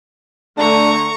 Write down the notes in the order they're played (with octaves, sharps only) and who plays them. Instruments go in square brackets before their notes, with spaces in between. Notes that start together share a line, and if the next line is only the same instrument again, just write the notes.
[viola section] D3 A3 [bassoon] D4 [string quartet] A#5 C#6